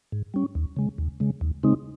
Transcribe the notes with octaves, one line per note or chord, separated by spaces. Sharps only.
G#2
G3 C#4
D#2
C#3 G#3
D#2
C#3 G#3
D#2
C#3 G#3 C4 D#4